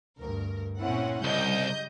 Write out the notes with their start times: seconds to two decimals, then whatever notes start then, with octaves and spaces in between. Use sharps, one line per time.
0.19 D2 G2 A#4
0.80 A#2 C4 C#4 E4 F#5
1.24 C2 C#3 G3 D#5 G6